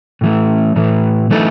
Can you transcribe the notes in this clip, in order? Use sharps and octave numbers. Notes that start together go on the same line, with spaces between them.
A2 E3 A3
A2 E3 A3
E3 A3 D#4 A4